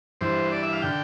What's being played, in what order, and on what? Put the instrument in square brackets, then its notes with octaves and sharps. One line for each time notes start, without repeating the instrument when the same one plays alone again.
[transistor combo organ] G2 E3 C5
D5
E5
F5
D3 G5